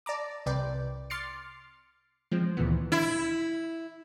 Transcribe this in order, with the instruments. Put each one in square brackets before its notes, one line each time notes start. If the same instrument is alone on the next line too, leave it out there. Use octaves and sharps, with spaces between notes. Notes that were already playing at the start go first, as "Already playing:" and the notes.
[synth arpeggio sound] D5 A5 A#5 D6
C2 C3 B4 D5 G5
C6 D6 F6 A6 C7 C#7
F3 G#3 C4
D2 A#2 D#3 E3 B3
[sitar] E4